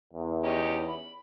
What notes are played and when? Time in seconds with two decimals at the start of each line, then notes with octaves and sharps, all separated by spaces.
0.13 E2
0.44 C#4 D#4 G4
0.88 B5